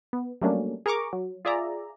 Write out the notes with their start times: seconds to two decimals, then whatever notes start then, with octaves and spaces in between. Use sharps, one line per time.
0.13 B3
0.42 F#3 G3 A3 A#3 C#4 D4
0.86 G#4 A#4 A#5 C#6 D6
1.13 F#3
1.45 F4 G#4 D5 E5 A#5